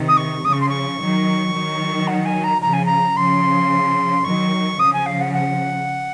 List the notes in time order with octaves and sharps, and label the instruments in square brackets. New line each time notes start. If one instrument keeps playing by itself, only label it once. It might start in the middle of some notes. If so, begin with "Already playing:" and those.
Already playing: [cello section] C3 D#3
[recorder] D#6
C#6
[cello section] C#3 F3 [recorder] D#6
[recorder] C#6
C6
C#6
[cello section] D#3 F#3
D#3 F#3
[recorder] F#5
G#5
A#5
[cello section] C#3 F3 [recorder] A#5
[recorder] G#5
A#5
[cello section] C#3 F3 [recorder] C6
[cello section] D#3 F#3 [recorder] C#6
[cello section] C#3 F3 [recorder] D#6
[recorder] G#5
F5
F#5
F#5